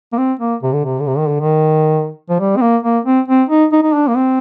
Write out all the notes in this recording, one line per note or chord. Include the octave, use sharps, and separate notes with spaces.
A#3
C4
A#3
C3
D3
C3
D3
C3
D#3
D3
D#3
F3
G3
C4
A#3
A#3
C4
C4
D#4
D#4
D#4
D4
A#3
C4